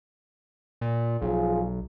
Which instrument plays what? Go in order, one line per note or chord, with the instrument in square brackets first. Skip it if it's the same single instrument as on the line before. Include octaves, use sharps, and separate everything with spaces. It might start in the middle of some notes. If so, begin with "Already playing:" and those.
[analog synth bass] A#2
[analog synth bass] B1 [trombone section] F3 F4 G#4